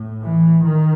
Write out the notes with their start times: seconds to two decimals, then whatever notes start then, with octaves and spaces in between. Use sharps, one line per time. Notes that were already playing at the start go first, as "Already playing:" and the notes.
Already playing: A2
0.23 E3
0.64 D#3